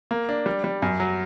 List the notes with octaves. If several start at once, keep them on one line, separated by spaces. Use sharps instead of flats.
A#3
D4
G3
G3
F#2
F#3